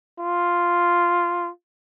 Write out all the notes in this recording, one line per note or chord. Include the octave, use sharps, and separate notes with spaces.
F4